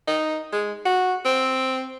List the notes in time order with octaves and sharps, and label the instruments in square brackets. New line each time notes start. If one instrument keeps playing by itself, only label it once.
[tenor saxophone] D#4
G#3
F#4
C4